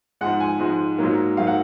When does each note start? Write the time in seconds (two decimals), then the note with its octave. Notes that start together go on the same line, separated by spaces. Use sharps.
0.21 G#2 F3 G#3 F#5
0.40 G#5
0.60 G#2 F3 G#3
0.98 G#2 F#3 A#3
1.37 G#2 F#3 A#3 F5
1.47 F#5